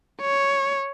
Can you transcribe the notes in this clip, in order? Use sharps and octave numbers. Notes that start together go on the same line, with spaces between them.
C#5